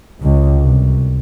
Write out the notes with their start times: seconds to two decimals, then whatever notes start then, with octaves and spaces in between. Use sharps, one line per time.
0.22 C#2
0.63 C2